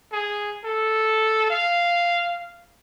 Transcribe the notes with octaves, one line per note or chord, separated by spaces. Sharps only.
G#4
A4
F5